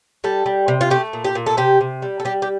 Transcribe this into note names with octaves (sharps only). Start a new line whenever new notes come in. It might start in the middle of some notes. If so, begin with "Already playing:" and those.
G3 A4
G3
C3
F4
A3 G4
A#2
G4
A#2
A4
C3 G4
C3
G3
A4
G3 G4
G4